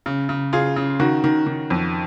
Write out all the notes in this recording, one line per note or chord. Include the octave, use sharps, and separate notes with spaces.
C#3
C#3
C#3 F4 G#4
C#3
D#3 F#4
D#3
D#3
F2